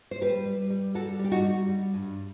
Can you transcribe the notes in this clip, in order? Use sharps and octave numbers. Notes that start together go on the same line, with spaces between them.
C5
G3 G4 B4
G3
G3
G3 F#4 A4
G3
G4
D#4 F#4
G3
G3
G2